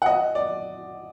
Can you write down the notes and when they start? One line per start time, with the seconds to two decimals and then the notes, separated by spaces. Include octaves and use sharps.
0.02 F#5
0.06 D#5
0.35 D5